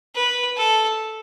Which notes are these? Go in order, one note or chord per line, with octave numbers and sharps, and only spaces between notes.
B4
A4